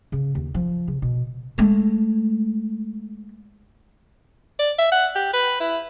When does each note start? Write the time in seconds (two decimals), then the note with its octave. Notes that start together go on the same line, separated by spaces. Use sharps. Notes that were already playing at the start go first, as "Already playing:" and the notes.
0.12 C#3
0.35 D#2
0.54 F3
0.88 C#3
1.02 B2
1.58 G#3 A3
4.59 D5
4.79 E5
4.92 F#5
5.15 G4
5.33 B4
5.60 E4